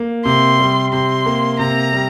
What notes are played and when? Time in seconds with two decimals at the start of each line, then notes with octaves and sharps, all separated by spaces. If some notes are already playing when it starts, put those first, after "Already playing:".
Already playing: A#3
0.25 C3 C6
0.59 G3
0.93 C3 C6
1.26 A#3
1.59 C3 A#5
1.93 G3